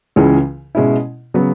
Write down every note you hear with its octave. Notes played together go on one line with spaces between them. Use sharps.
C#2 C#3 E3 G#3 C#4
B2 G#3 C#4 E4
C#3 F#3 B3